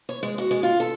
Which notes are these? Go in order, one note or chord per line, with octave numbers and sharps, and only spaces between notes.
C#5
G#3
F#4
G#3
F4
A4